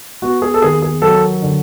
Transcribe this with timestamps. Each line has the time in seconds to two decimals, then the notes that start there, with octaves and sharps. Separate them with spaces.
0.22 B3 F#4
0.42 G#4
0.54 A4
0.62 D#2 G#4
0.82 G#4
1.02 F#3 A4
1.42 D3